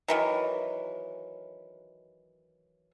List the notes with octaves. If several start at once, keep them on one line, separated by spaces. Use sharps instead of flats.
D#3 E3 F#3